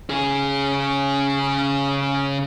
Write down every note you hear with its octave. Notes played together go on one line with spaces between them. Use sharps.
C#3 G#4